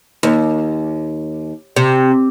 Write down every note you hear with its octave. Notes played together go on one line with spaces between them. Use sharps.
D#2
C3